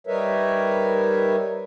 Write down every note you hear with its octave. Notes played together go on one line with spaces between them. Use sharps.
G3 D#4 A#4 B4 C#5 E5